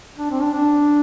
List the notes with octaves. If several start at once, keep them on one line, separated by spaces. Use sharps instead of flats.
D4
C4
D4
D4